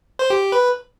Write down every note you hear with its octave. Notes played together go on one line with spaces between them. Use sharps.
C5
G4
G4
B4